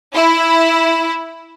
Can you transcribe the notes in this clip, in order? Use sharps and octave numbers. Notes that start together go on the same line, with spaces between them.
E4